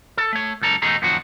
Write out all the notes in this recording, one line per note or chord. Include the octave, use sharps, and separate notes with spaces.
A4
A3 C#5
C#2 F#2 A4 A#5
E2 B2 A3 D#4 G#4 A#5
F#2 A#2 D#3 F3 F#3 F#4